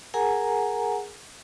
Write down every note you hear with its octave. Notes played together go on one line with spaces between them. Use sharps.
G#4 A#4 F#5 G#5 A#5